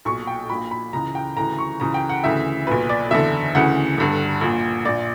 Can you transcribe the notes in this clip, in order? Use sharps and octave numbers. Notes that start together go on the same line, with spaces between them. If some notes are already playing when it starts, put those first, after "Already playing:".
B1 A#2 C#6
G5
A#1 A#2 B5
B5
C#2 C#3 E3 A#5
G5
D2 C#3 E3 A#5
C#6
C#2 C#3 E3 A#5
G5
F#5
D2 C#3 E3 E5
B1 A#2 B4
D5
F#1 E2 D3 E5
D2 C#3 E3 F#5
G1 G2 D3
A#1 A#2
A#1 A#2 D5